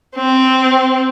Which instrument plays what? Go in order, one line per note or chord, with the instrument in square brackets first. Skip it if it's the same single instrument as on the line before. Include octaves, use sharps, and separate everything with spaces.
[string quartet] C4